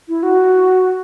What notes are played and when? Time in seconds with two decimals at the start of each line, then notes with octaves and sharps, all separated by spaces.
0.09 E4
0.23 F#4